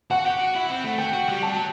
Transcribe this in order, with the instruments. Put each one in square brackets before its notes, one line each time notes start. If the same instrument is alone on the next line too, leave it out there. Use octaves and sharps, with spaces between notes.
[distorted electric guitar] F#4 [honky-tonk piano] F#5
[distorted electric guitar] G4
F#4
E4
C4
A3
[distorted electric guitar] F#4 [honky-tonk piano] G5
[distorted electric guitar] F#4
G3
[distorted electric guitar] F#3 [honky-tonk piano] A5